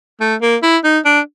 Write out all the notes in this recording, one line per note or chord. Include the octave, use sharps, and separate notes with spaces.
A3
A#3
E4
D#4
D4